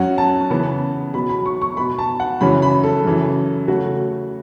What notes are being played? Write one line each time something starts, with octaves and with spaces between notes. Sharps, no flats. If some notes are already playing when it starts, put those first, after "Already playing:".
Already playing: F#2 F#3 C#4 F#5
A5
C#3 E3 B3
B2 F#3 B3 B5
B5
C#6
C#6
B2 B3 B5
A5
F#5
F#2 C#3 E3 C#4 B5
B5
A4
F#2 C#3 E3
C#3 A3 C#4 F#4